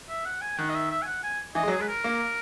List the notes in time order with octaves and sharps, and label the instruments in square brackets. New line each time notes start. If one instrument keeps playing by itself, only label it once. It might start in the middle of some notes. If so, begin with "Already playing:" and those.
[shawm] E5
F#5
G#5
[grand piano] D#3 [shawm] F#5
[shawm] D#5
E5
E5
G#5
F#5
G#5
[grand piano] E3 [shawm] D#5
[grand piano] G#3
F#3
[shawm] G#4
[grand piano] G#3 [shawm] B4
[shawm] A#4
[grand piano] A#3